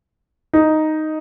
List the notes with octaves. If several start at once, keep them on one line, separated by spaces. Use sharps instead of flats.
D#4